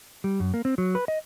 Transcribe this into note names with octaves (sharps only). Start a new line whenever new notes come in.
G3
F#2
A#3
C4
F#3
B4
D#5